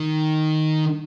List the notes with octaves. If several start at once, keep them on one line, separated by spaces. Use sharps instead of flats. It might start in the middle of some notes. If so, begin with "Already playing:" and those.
Already playing: D#3